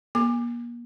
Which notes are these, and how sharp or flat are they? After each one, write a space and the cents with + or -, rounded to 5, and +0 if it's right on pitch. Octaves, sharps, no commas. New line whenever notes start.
A#3 +35 D6 +20